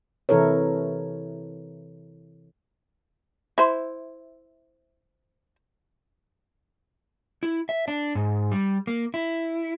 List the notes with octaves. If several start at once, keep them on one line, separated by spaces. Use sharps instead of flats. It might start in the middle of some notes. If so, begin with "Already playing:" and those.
C3 E3 E4 A4 A#4 C#5
E4 C5
E4
E5
D4
G#2
G3
A#3
E4